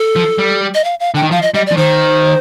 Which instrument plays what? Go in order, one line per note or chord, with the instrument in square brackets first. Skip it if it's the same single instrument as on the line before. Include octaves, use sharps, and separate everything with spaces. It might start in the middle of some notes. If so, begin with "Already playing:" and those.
Already playing: [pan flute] A4
[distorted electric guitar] F3
G3
[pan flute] D#5
F5
F5
[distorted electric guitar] D3 [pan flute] G5
[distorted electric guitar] D#3
[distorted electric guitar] F3 [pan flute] F5
[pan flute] D#5
[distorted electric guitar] G3 [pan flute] D#5
[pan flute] D5
[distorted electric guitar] F3
[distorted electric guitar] D#3 [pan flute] C5